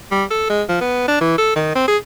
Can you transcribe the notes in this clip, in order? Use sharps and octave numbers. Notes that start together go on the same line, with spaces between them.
G3
A4
G#3
F3
B3
D4
E3
A4
D#3
C4
G#4